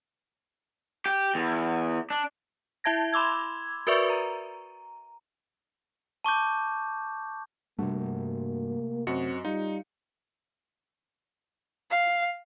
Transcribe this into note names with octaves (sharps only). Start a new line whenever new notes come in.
G4
E2
D4
E4 E5 A5 G#6 A#6
B5 C6 D6 E6 G#6
F#4 A#4 B4 D5 E5 C#6
A#5
A5 C#6 D6 G6
G2 C3 A3 A#3 F#4
F#2 C4 F#4 D#5 C#7
G3 D#4 F4
F5